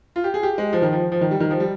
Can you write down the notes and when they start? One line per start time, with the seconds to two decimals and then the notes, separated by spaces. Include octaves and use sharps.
0.16 F4
0.24 G4
0.34 G#4
0.43 G4
0.58 G#3
0.73 F3
0.82 D#3
0.92 F3
1.12 F3
1.21 D#3
1.31 G3
1.40 D#3
1.51 F3
1.60 G3